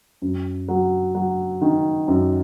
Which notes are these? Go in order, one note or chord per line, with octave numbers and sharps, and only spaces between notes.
F#2
F#3
F#3
D#3
F#2